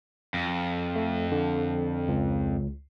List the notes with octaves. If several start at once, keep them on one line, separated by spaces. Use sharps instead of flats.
F2
A3
D3
C#2